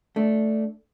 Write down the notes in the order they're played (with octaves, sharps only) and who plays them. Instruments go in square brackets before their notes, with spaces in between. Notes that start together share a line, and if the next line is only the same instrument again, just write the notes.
[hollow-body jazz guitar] A3 D4